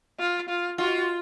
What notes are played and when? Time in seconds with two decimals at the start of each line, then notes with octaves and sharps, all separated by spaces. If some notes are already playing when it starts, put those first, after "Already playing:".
0.19 F4
0.49 F4
0.78 F4 F#4